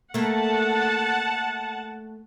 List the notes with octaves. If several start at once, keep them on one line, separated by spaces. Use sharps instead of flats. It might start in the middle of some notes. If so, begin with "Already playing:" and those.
A3 A#3 F#5 A5